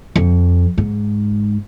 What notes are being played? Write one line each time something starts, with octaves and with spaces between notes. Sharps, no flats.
F2
G#2